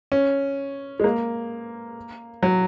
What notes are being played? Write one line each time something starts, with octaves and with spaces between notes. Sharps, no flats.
C#4
G#3
A#3
F#3